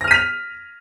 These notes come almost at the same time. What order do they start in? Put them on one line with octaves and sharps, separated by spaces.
A#6 F6 D#7 B6 F7